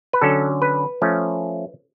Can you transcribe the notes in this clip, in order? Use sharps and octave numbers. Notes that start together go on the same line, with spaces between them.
B4
D3 F#3 C#4 A4
B4
F3 A3 C#4